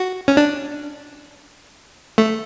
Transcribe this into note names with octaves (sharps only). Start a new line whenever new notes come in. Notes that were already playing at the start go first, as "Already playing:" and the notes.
Already playing: F#4
C#4
D4
A3